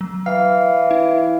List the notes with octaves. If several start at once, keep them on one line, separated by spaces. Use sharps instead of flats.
F#3
E3 F5 G5
E4